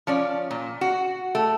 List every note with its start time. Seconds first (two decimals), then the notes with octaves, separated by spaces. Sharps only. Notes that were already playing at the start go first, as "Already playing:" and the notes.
0.07 F3 C#4 D5
0.51 A#2
0.81 F#4
1.35 A3